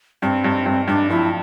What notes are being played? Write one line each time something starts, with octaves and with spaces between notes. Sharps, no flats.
G2 C4
G2
G2
G2 D4
F3 E4